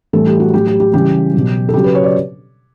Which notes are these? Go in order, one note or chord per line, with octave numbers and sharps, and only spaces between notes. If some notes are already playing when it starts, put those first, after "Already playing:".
A2 E3 G3 A4
G4
F#4
A2 F#3 G4
G4
G4
C#3 E3 G3 G4
B2 F#3
A4
C#3 F#3 G4
B4
C#5
D5